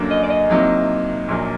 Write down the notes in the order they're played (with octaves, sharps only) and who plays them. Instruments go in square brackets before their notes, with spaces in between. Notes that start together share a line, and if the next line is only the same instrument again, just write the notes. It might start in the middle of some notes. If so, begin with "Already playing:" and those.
Already playing: [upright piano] F#2 D3 F#3 A#3 D4
[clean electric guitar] D#5
D5
D#5
[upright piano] C2 C3 F#3 A#3 D#4
A#1 A#2 F#3 A#3